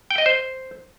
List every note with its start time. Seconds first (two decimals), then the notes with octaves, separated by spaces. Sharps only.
0.11 G5
0.18 D#5
0.26 C5